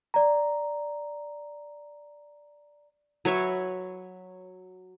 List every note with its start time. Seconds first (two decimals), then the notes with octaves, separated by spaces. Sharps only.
0.14 D5 A#5
3.25 F#3 B4 C#5 E5